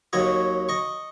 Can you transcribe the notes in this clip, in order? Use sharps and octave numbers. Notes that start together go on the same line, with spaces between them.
D#2 F#3 C#5 D#5
D#5 C#6